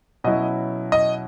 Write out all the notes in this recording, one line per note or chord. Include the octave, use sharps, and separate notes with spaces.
B2 F#3 C#4 E4 D#5
D#5